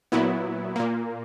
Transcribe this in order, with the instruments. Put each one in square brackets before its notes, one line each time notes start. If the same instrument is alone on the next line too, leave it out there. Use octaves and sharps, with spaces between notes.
[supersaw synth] A#2 F#3 B3 E4
A#2 A#3